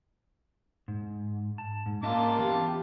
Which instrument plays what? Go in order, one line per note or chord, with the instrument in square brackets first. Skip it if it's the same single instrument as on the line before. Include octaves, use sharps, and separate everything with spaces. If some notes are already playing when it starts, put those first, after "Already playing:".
[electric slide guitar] G#2
A5
G#2
[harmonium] A#3 [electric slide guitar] C#4 D#5 E5 [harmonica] F4 A5 D6
[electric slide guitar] E3 B3 [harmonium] G4